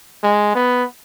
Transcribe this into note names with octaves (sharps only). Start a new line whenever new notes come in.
G#3
B3